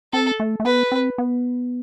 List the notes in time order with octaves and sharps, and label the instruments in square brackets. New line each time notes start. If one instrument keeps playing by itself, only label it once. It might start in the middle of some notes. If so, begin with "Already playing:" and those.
[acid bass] C4 [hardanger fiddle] A4
[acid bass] A3
A3
[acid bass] B3 [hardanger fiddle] B4
[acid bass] C4
B3